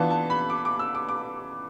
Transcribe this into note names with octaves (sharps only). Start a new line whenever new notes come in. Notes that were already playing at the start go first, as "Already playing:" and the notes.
Already playing: E3 B3 D4 F4 A5
A5
B5
D6
D6
E6
D6
D6